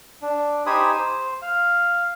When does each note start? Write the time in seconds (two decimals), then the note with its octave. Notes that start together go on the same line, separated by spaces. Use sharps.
0.22 D4
0.66 D#4 G4 C5 G#5 B5 D#6
0.92 C5
1.42 F5